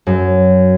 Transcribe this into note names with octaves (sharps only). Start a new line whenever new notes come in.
F#2